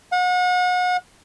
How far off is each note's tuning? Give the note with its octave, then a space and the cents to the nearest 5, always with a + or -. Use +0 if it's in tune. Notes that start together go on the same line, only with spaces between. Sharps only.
F#5 -35